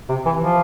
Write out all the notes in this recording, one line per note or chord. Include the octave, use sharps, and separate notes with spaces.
C3
E3
F3